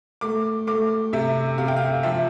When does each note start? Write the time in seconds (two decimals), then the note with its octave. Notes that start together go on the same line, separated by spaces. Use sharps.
0.21 A3 D6
0.67 A3 D6
1.13 C3 E5
1.58 C3 F5
1.68 G5
1.76 F5
2.03 F3 E5